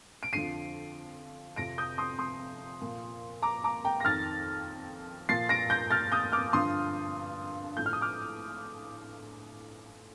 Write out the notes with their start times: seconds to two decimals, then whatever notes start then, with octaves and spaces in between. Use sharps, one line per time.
0.23 D7
0.33 F2 D3 F3 C7 D#7
1.56 F2 C3 F3 A#6 D7
1.78 D#6 G6
1.98 C6 D#6
2.19 C6 D#6
2.82 A#2 F3
3.42 A#5 D6
3.64 A#5 D6
3.85 G5 A#5
4.00 A#6
4.05 F2 D#3 F6 A6
5.29 A#2 F3 A6 C7
5.49 A#6 D7
5.70 G6 A#6
5.91 F6 A6
6.12 D#6 G6
6.32 D6 F6
6.53 G2 D3 F3 C6 D#6
7.77 A2 F3 G6
7.86 F6
7.93 D#6
8.01 D6 F6